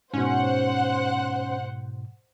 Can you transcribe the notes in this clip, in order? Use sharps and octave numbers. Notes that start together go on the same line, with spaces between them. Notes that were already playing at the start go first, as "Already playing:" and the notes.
G#2 B2 C#4 C5 F#5